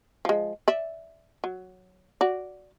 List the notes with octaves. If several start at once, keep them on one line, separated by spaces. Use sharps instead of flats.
F3 G#3
D5 E5
F#3
F#4 D5